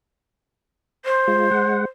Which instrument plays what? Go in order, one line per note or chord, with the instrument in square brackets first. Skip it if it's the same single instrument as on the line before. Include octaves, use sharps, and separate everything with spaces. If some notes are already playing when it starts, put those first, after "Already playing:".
[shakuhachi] C5
[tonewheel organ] G#3 F4
G#3 F#5